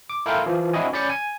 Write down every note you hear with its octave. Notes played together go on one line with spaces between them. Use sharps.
D6
E4 A4 A#4 F5 G5 C6
E3 F3
C4 D4 E4 F#4 D#5 G#5
C#4 D5 B5 G6 A6 C#7
G#5